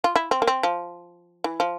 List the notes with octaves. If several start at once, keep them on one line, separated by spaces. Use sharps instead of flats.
F4
E4
C4
A#3
C4
F3
E3
F3